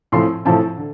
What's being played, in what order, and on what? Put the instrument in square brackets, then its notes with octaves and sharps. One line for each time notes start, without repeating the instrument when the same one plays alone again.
[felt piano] A2 F3 C4 C6
A2 F3 C4 A5
D3